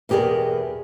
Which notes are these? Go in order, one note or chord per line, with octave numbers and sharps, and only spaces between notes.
E2 B2 G4 G#4 A#4 D5